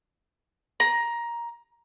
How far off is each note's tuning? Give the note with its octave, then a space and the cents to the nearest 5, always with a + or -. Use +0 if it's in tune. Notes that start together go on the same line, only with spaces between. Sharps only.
A#5 +15